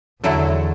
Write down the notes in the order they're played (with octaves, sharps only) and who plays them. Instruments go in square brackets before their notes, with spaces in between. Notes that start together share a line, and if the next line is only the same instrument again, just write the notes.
[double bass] E2 [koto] D3 F#3 A3 E4 A4